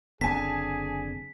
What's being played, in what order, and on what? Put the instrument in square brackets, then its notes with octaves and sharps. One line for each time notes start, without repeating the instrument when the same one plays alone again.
[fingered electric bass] F#1 D3 C4 [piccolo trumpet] G#4 [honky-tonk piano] G#5 A5 [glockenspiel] B6